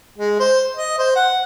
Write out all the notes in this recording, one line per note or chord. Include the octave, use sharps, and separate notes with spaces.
G#3
C5
D#5
C5
F#5